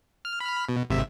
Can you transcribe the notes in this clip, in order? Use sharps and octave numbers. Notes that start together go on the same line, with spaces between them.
F6
B5 F6
B2
G#1 C3 E5